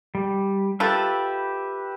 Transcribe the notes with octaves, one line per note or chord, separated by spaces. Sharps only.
G3
F4 G4 A4 B4 E5